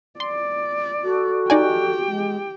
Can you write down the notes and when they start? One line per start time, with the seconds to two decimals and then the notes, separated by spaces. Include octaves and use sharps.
0.20 D5 C6
1.03 F#4 A4
1.50 D#4 G4 D5 G5 G#5
2.07 G#3